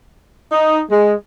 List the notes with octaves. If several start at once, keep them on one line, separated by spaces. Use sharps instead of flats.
D#4
G#3